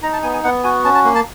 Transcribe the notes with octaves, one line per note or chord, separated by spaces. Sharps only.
D#4 A#5
A5
B3 G#5
G#5
B3 F#5
F#4 G#5
C#4 A5
A5
A#3
A5